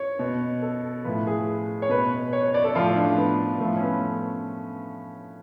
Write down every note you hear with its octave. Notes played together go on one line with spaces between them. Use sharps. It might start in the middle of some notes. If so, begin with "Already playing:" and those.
Already playing: C#5
B2
A4
A2 F3 B4
G#4
C#5
B2 B4
C#5
C#5
D5
A4
A2 F3 F4
D4
B3
A2 F3 A3
C#4
B3